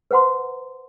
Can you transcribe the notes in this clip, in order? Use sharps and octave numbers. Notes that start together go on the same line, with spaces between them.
B4 C5 F#5 A#5 C6